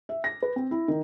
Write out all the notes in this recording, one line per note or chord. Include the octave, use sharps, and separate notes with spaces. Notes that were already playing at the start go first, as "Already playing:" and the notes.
E5
A#6
B4
C4
E4
D#3